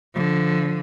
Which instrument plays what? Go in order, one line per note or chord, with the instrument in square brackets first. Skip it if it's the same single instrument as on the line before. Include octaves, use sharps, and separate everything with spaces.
[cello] D3 F3